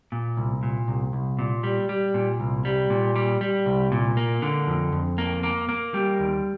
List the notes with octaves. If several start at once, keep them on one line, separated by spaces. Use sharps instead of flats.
A#2
C2
A#2
C2
C2
A#2
G3
G3
A#2
C2
G3
A#2
G3
G3
C2
A#2
A#3
D3
F2
F2
A#3
A#3
A#3
G3
D#2